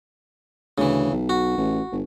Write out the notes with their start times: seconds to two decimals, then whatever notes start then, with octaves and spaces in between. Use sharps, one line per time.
0.78 D2 C#3 E3
1.12 B1
1.29 F#4
1.57 A1
1.92 G1